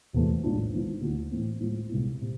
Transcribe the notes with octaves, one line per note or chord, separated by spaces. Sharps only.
E1 E2 C3 E3 A3
B1 A2 G#3 D4 F4
G#1 G#2 F3 B3 E4
D2 D3 A3 E4
A2 E3 A3 C4
A2 F3 G#3
C2 C3 G#3 B3 E4
C3